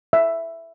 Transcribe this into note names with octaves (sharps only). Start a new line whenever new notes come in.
E5